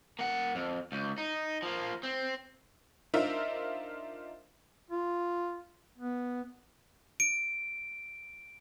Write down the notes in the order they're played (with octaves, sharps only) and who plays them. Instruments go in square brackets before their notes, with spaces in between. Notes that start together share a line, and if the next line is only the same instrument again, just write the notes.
[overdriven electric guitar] A#3 F#5
F2
C#2
D#4
F3 A#3
C4
[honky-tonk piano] D4 D#4 F4 A#4 C5 E5
[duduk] F4
B3
[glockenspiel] D7